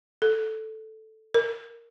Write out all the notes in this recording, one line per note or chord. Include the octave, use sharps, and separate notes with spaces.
A4
A#4